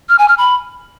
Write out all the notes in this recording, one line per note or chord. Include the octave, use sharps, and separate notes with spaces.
F6
G#5
F6
B5